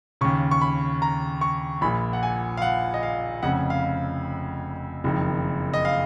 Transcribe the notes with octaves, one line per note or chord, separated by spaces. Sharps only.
D#2 C#3 C#6
C#6
B5
A#5
C#6
A#1 A#2 B5
F#5
G#5
F5
F#5
D#5
F5
F1 F2 C#3 F#5
F5
F#1 F2 D#3
D#5
F5